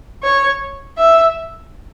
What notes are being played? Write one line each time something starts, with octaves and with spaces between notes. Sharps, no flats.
C#5
E5